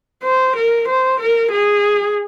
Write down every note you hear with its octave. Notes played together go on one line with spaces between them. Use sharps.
C5
A#4
C5
A#4
G#4